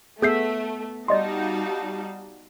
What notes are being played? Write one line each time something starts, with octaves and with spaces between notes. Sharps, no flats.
A3 B3 G#4 E5 G6 C7
G3 D#4 F#4 D5 D#5 F5 A5 C6